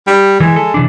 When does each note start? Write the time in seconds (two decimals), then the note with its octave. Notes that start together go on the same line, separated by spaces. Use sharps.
0.07 G3
0.40 E3 G#3
0.56 A4
0.74 C3 E3 D4